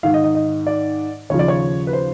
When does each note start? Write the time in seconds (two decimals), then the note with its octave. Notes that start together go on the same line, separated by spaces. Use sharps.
0.03 G#2 D#3 F5
0.14 D#5
0.24 D#5
0.35 D#5
0.67 D5
1.30 D#2 C#3 F3 C#5
1.39 D5
1.48 C#5
1.87 B4
1.93 C5